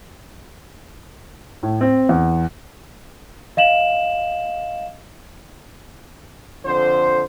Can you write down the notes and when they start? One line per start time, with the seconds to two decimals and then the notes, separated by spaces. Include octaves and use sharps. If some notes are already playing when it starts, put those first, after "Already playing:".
1.63 A2
1.81 C4
2.09 E2
3.57 D#5 F5 E7 F#7
6.66 F2 D3 C5